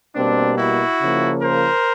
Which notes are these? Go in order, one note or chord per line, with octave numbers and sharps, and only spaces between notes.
B2 G3 A#3 C4 D4
E4 F#4
C#3 F3 A#3
A#4 C5